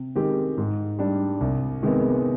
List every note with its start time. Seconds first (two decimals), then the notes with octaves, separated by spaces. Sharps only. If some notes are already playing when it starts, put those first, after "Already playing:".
Already playing: C3
0.15 D#3 G#3 C4 G4
0.58 G#2
0.99 G3 D4
1.41 C2
1.83 C3 D#3 G#3 B3